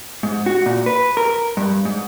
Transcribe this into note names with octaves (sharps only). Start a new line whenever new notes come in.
G#2
F#4
A#2
B4
A#4
G2
G#2